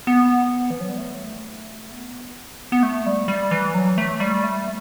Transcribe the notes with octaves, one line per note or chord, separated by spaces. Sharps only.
B3
E3
F#3
G3
A3
B3
B3
A3
G3
G3
E3
F#3
A3
G3
A3